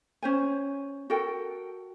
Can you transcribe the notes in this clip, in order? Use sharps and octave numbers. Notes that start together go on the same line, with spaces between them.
C#4 C5 G#5
F#4 A4 A#4 G5